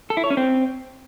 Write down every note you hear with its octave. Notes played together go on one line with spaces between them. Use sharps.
A4
E4
C#5
C#4
C4